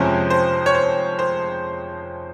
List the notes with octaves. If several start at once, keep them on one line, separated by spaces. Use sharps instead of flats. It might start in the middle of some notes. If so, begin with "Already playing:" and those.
Already playing: F2 C3 F3 G#3 C#4 C5
C5
C#5
C5
C5